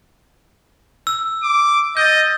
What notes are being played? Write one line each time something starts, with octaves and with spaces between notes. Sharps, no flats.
E6
D6
D#5 G6 A6